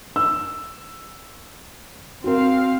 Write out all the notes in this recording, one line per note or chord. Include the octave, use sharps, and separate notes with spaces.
E6
C4 F#4 A#4 F5